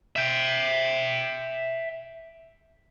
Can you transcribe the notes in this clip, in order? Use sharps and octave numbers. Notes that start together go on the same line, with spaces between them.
E5 G5